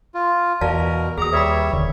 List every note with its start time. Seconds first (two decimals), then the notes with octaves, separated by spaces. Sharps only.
0.14 F4
0.61 E2 B2 A#4 D5 F5 A5
1.18 D#2 G#4 A#5 D#6
1.33 G3 B4 C#5 E5 B5
1.73 E1 D#2 D3